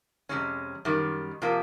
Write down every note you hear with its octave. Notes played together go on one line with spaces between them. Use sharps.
F2 C3 E3 G#3 C#4
F#2 D#3 G3
C3 F3 A#3